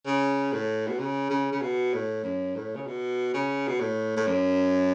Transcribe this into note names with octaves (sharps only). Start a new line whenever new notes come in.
C#3
A2
B2
C#3
C#3
C#3
B2
A2
F#2
A2
C#3
B2
C#3
B2
A2
A2
F#2